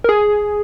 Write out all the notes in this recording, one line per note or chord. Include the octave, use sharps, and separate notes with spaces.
A#4
G#4